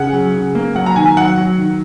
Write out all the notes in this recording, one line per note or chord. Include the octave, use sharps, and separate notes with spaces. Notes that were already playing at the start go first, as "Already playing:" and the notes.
Already playing: C#3 F#5
F#3
C#3
A#3
F#3 F#5
A#5
D#3 G#5
F#3 F#5
F#3
D#3